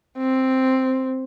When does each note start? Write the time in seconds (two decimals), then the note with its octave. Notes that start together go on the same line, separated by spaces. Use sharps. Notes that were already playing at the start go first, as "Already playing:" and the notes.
0.18 C4